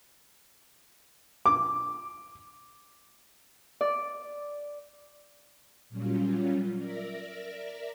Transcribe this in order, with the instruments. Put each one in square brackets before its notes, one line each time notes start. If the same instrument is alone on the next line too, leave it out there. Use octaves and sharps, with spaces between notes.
[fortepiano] D6
[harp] D5
[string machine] A#2 F#3 G3 C#4 F4
A#4 D5 E5 A#6